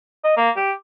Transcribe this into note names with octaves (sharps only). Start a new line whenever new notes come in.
D#5
A#3
G4